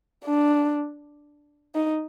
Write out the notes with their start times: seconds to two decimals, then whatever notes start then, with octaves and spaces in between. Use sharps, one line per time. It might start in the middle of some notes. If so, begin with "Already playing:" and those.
0.25 D4
1.75 D#4